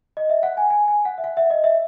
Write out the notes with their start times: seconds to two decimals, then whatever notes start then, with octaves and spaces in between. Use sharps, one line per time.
0.17 D#5
0.30 E5
0.43 F#5
0.57 G#5
0.70 G#5
0.88 G#5
1.05 F#5
1.18 E5
1.24 F#5
1.37 E5
1.50 D#5
1.64 E5